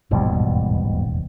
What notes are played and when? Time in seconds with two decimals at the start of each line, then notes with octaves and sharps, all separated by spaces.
0.11 E1 A1 D#2 G#2 B2 G3